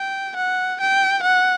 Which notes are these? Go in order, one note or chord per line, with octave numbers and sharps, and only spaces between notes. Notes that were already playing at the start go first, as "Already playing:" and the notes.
Already playing: G5
F#5
G5
F#5